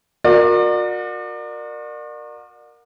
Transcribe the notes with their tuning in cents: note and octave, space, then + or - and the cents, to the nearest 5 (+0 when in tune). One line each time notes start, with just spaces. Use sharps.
F#4 -40 A#4 +0 D5 +35